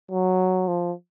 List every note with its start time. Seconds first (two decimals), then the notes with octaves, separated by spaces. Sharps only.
0.11 F#3
0.68 F3